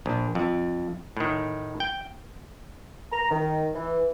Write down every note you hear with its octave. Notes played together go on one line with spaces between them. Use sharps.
A#1
F2
A2 D#3
G5
A#5
D#3
E3